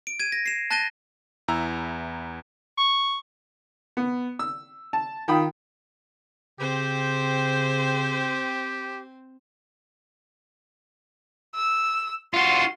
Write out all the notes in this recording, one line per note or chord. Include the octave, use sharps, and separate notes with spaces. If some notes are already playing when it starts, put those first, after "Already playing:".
D7
G#6 D#7
A#6
C7 E7
A5 F#6 A6 A#6 D#7 G7
E2 E4 A#5 E6
C#6
B3
E6
A5
D#3 F4 G5 B5 D#6
C#3 C4 G4 C5
E6
F4 F#4 C6